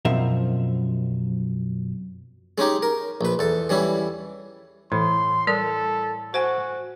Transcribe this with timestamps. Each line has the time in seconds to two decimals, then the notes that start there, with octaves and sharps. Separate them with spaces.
0.05 F#2 B2 F3 C4 A#4 E5
2.58 G#3 C#4 D#4 G4
2.83 A#4
3.21 A#1 B4
3.39 E2 A4
3.69 E3 G3 C#4 E4
4.92 A2 E3 C6
5.47 G3 A4 A#4 D5
6.34 F#4 C5 F#5 G#5